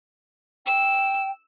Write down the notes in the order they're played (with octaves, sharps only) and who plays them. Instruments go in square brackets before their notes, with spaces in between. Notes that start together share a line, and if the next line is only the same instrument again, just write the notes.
[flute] G5 [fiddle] E6